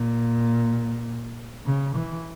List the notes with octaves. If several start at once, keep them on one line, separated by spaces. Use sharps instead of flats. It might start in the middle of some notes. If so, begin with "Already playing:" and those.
Already playing: A#2
C#3
E3